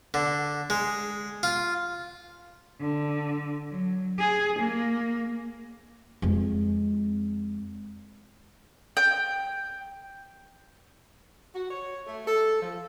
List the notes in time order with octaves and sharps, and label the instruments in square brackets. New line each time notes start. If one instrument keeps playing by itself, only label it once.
[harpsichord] D3
G#3
F4
[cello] D3
F#3
G#4
A#3
[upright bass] F2 G#3
[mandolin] G5
[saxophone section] F#4
C#5
A3
A4
F3